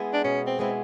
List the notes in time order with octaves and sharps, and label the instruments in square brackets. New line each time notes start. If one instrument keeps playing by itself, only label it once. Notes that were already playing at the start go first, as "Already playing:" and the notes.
Already playing: [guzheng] G#3 B3 E4
[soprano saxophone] D4
[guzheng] B2 [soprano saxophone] C#4
[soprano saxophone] C4
[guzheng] G#3 B3 E4 [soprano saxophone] C4